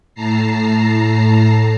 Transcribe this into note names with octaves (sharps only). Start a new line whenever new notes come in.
A2 A5 A#5 C7